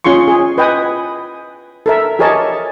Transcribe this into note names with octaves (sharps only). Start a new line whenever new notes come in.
C#4 F4 G#4 C6 C#6
G#4
B4 D#5 G5 G#5 D#6
A4 A#4 E5
G4 G#4 A#4 C#5 D#5 A5